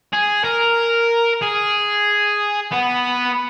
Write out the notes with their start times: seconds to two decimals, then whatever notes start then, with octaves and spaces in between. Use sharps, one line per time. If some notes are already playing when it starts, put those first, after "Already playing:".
0.13 G#4
0.44 A#4
1.42 G#4
2.71 B3